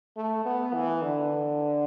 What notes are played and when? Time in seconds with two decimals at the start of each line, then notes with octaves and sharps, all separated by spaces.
0.17 A3
0.45 B3
0.73 E3
1.02 D3